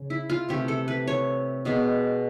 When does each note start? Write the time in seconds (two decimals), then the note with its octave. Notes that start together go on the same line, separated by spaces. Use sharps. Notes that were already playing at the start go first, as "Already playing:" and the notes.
Already playing: C#3
0.10 E4
0.30 F4
0.49 C3 E3 A3 G4
0.68 A4
0.88 B4
1.07 C#5
1.65 B2 G#3 B3